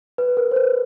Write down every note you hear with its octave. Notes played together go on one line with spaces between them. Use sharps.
B4
A#4
C5
B4